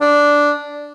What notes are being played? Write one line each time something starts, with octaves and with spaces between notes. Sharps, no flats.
D4